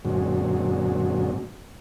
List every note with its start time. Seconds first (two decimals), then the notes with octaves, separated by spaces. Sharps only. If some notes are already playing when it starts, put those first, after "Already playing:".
0.05 F#2 A#2 D3 F#3 G#3 C4